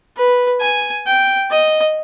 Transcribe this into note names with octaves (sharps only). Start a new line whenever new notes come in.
B4
G#5
G5
D#5